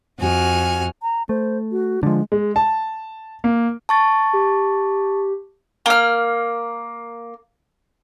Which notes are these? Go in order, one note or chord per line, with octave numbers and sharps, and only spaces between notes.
F2 F#4 G#5 F6
A#5
A3 C5
F#4
D3 F3 G#3
G#3
A5
A#3
A5 C#6 A6
G4
A#3 F6